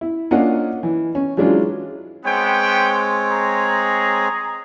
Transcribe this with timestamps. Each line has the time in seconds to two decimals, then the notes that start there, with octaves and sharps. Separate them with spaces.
0.01 E4
0.31 A#3 C#4 D4 F4 D#5 F#5
0.83 E3
1.15 C#4
1.37 E3 F#3 G#3 C#4 D4 F4
2.25 G#3 B3 C4 C#5 G5
3.29 G#4 A#5